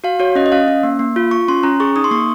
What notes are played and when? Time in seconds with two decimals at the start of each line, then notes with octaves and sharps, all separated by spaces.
0.04 F#4 F5
0.19 F#4 C#5
0.35 C#4 D#5
0.46 D#5
0.52 C#4 F5
0.68 C#4
0.83 A#3
0.99 A#3
1.16 F4
1.31 F4 C#6
1.48 C#4 C6
1.63 C#4 A#5
1.80 G#4 C#6
1.96 D#4 D#6
2.04 C6
2.11 A#3 C#6